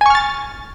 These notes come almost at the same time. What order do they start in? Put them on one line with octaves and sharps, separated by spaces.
G#5 C#6 F6 A6